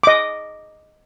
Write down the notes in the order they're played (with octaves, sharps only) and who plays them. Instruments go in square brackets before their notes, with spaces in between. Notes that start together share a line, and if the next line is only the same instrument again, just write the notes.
[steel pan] D#5 D6